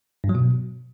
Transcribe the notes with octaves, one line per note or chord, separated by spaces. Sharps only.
G2
F#3
B2